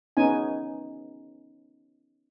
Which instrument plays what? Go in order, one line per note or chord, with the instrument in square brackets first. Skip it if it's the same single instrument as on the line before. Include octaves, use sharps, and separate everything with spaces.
[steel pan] B3 C#4 D#4 G#5